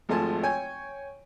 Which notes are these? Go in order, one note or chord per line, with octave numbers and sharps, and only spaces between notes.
G#1 F3 G#3 A3 G#5 A5
C#5 G5 G#5